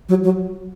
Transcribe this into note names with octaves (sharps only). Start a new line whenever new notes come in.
F#3
F#3